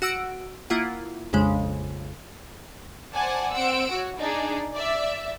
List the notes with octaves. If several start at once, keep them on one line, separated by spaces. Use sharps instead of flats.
F#4 F#5 E6 D7
A#3 E4 F4 F#5
A#1 F2 C#3 G#3
C5 D5 F#5 G#5 A5
C4 F#5 E6 D7
F#4 C#5
D4 D#4 G#4 D5
D5 E5